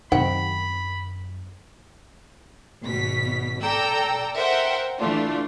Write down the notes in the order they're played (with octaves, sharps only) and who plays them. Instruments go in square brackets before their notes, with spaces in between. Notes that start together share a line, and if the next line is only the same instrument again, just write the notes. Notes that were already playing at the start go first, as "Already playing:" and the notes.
[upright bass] F#2 [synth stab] C3 D#3 [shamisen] C5 F#5 G5 [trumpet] B5
[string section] G#1 B2 B6
A4 D5 G5 A#5 E6
A#4 C5 E5 F#5 G5
E3 A3 D4 F4